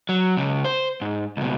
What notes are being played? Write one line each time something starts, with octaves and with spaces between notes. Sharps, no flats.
F#3
C#2 C#3
C5
G#2
C#2 B2